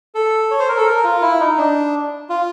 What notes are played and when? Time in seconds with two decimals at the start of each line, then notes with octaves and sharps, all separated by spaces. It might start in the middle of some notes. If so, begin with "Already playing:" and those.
0.15 A4
0.51 C#5
0.60 C5
0.69 A#4
0.78 A4
0.86 A#4
1.04 F4
1.22 E4
1.40 D#4
1.57 D4
2.29 F4